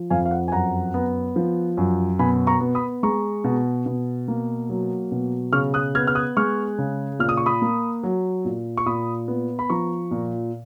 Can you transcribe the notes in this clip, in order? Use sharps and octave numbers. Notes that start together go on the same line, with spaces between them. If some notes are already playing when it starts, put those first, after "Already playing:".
Already playing: F3
F2 F5 G#5
F5
F#5
G#5
F#2 F#5 A#5
B3
F3
F#2
B2 G#5 B5
A#5 C#6
B3
B5 D#6
G#3 A#5 C#6
B2
B2
A#3
F#3
B2
C#3 C#6 F6
D#6 F#6
B3 F6 G#6
F6
D#6 F#6
G#3 C#6 F6
C#3
A#2 F6
D#6
C#6
B5 D#6
A#3
F#3
A#2
C#6
A#2 B5 D#6
B3
B5
F3 A#5 C#6
A#2